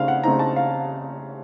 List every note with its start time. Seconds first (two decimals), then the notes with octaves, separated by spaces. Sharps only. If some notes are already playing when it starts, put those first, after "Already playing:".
Already playing: C#3 A3 C4 D#4 F5
0.08 F#5
0.24 C#3 A3 C4 D#4 A#5
0.39 A5
0.56 F5